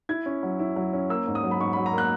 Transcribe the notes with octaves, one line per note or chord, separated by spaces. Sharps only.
E4 G#6
C#4
F#3
E4
F#3
C#4
A#3 E6
G#2
D#6
F#3
B5
G#2 C#6
B5
F#3
A#5
A#3 F#6